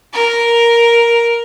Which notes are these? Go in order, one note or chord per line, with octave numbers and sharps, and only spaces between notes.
A#4